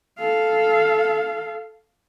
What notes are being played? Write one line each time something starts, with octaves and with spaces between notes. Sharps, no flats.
A4 F5